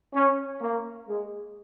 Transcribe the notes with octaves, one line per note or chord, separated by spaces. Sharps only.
C#4
A#3
G#3